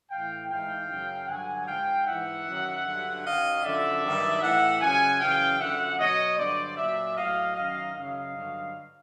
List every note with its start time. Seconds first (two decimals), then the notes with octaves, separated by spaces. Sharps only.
0.10 A2 E3 F5 G5
0.50 G#2 E3 F5 G5
0.89 F#2 C#3 F#3
1.28 G2 D3 F#3 F#5 G#5
1.67 G#2 F3 F5 G5
2.06 G#2 E3 E5 F#5
2.45 F#2 D#3 F#3
2.85 G2 D3 F#3
3.24 F#2 D#3 F#3 D#5 F5
3.63 F#2 D3 F3 D5 E5
4.03 G2 D#3 F#3
4.42 A2 E3 E5 F#5
4.81 F#2 C#3 F3 F#5 G#5
5.20 F#2 C#3 E3 F5 G5
5.59 F#2 D3 F3 E5 F#5
5.99 B2 F#3 C#5 D#5
6.38 G2 D3 F#3 C5 D5
6.77 A#2 F#3 D5 E5
7.16 A2 F#3 D#5 F5
7.56 F#2 D#3 F#3 D#5 F5
7.95 F#2 C#3 F#3 D#5 F5
8.34 G2 D3 F#3